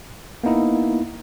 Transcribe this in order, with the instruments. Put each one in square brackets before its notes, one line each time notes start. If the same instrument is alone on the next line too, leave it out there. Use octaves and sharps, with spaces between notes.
[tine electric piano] A#3 B3 D#4 E4